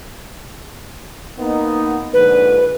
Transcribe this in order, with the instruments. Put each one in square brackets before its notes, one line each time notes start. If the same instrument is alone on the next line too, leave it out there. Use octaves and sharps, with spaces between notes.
[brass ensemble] A#3 B3 D#4
[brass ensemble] A#1 G#2 D3 [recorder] B4